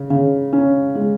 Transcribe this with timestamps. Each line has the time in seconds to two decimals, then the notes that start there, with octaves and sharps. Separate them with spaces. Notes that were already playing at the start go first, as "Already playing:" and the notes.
Already playing: C#3
0.10 C#3
0.53 C#4
0.95 G#3